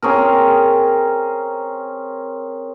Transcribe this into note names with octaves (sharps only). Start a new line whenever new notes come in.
C4 C#4 G#4 A#4